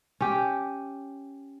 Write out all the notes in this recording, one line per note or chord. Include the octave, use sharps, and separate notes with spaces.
C#4 G4